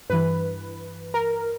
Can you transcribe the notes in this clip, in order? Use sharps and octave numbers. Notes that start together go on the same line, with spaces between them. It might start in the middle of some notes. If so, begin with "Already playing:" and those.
G2 E3 B4
A#4